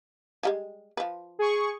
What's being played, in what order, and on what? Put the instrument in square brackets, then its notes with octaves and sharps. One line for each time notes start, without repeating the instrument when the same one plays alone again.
[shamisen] F3 G3 G#3
F3 B4
[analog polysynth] G#4 C#6